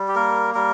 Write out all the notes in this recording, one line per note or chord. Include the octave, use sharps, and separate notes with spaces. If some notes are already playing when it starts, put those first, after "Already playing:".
Already playing: G3
G4
A#3 A#4
G3 A#4